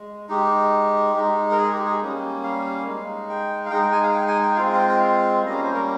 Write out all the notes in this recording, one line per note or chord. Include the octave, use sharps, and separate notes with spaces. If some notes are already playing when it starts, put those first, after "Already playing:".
Already playing: G#3
G#3 D#4 G4
G#3 D#4
A#4
G#4
G4
G#4
G3 A#3 C#4
F5
G#3 D#4
G5
F5
G#3 D#4 G5
G5
G#5
F5
G5
G#5
G5
G#3 C4 F4 F5
F5
G5
G5
F5
G3 A#3 C#4 D#5
F5
C5
A#4